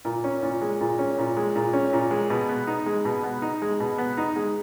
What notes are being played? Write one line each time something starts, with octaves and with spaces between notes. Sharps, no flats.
A#2
C#4
A#2
G#3
A#2
C#4
A#2
G#3
A#2
C#4
A#2
G#3
B2
B3
D#4
G#3
B2
B3
D#4
G#3
B2
B3
D#4
G#3